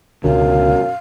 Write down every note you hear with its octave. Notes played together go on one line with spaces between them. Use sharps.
C#2 F#2 B2 D3 F5